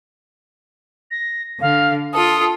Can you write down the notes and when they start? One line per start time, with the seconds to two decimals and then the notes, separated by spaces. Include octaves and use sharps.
1.11 A#6
1.61 D3 F5
2.13 F4 A4 D#6